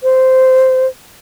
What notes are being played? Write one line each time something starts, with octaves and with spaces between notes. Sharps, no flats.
C5